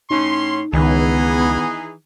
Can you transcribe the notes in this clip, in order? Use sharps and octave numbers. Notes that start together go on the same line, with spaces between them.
A2 C#4 D#4 C6
C#2 D#3 E3 B3 D#4 G#4